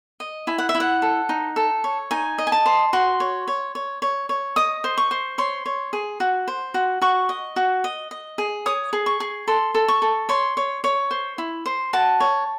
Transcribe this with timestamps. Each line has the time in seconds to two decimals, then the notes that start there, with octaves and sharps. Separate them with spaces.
0.20 D#5
0.47 E4 G#5
0.58 F#5
0.69 E5
0.75 E4
0.80 F#5
1.02 A4
1.29 D#4
1.56 A4
1.84 C#5
2.11 D#4 G#5
2.38 D#5
2.47 G#5
2.52 A5
2.66 C5
2.93 F#4 C6
3.20 C#5
3.48 C#5
3.75 C#5
4.02 C#5
4.29 C#5
4.56 D#5 D#6
4.84 C5
4.98 C#6
5.11 C5
5.38 C#5 C6
5.66 C#5
5.93 G#4
6.20 F#4
6.48 C5
6.74 F#4
7.01 F#4 C#6
7.29 D#5
7.56 F#4
7.84 D#5
8.11 D#5
8.38 G#4
8.66 C#5 D#6
8.93 G#4
9.06 C#6
9.20 G#4
9.47 A4 C6
9.75 A4
9.88 C#6
10.02 A4
10.29 C#5 C6
10.57 C#5
10.84 C#5
11.11 C5
11.38 E4
11.66 C5
11.93 F#4 A5
12.20 C#5